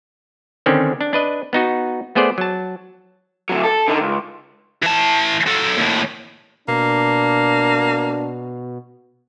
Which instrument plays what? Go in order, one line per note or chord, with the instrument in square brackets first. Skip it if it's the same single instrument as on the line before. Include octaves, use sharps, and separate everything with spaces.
[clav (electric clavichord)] D3 D#3 C4 C#4
D4
D4 B4 D#5
B3 D#4 F#4
A3 B3 G#4 C5 D5
F#3 A5
[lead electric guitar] D2 F#3
A4
D3 D#4
C#2
[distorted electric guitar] E3 A5
F#3 A4
D#2 A2
[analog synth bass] B2 [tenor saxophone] A#3 [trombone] D4